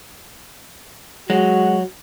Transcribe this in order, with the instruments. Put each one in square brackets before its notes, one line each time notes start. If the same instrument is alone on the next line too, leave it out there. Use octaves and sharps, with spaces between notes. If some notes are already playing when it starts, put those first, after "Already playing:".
[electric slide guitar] F#3 [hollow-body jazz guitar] G#3 [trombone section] F#4